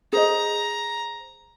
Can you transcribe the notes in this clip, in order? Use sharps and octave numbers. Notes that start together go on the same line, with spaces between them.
G#4 C5 D#5 A#5